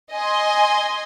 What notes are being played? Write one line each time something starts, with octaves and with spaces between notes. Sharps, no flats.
D#5 G#5 C6